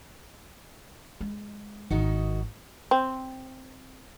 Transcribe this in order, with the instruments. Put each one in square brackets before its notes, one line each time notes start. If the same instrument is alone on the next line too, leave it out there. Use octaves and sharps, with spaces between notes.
[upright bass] G#3
[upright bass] G#1 [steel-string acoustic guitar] D#3 D#4 F#4
[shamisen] C4